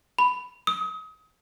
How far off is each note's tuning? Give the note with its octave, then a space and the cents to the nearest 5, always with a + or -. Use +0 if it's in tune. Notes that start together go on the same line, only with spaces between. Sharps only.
B5 +10
D#6 +35